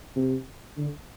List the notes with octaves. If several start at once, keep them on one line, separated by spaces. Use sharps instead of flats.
C3
D3